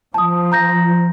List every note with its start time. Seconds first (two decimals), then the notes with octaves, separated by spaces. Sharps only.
0.14 F3 A5 D#6
0.52 A#5 G6 A#6